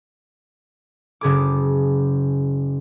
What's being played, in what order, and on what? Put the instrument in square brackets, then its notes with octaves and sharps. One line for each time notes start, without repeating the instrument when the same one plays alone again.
[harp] F#1 C#3 G#4 D6